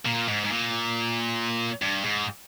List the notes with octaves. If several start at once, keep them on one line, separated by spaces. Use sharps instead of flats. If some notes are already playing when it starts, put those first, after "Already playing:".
A#2
G#2
G#2
A#2
G2
G#2